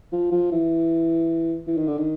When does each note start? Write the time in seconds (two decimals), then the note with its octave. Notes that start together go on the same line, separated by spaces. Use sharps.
0.12 F3
0.32 F3
0.52 E3
1.67 E3
1.77 D#3
1.88 D3
1.98 D#3